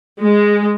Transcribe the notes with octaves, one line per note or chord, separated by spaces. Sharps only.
G#3